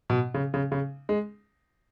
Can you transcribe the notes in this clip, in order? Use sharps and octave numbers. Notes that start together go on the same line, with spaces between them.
B2
C#3
C#3
C#3
G#3